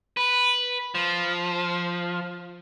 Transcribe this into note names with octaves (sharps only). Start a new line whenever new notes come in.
B4
F3